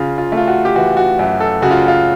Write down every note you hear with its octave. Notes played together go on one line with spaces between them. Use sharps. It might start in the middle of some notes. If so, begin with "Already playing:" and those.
Already playing: C#3 F4
F4
A3
F4
F#4
G4
E3 F#4
F#4
F#2
A4
C#3 F#4
F4
F4